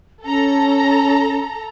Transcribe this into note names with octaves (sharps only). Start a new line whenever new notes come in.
C#4 A4 A#5